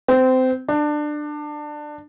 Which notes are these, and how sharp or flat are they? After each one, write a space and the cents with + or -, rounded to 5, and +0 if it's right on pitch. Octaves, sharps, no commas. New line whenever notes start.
C4 -20
D4 +20